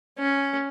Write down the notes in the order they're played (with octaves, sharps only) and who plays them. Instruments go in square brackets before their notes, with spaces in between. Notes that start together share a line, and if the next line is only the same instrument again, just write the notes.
[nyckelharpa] C#4